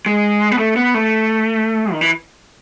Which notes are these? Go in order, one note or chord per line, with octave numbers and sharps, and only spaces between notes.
G#3
B3
A3
B3
A3
D#3
E3